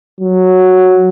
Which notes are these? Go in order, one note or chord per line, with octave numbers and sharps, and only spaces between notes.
F#3